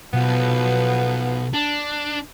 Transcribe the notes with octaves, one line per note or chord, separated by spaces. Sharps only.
B1 B2 F3 B3
D4